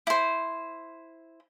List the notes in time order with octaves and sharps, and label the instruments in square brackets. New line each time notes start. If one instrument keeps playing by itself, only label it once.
[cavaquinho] E4 C5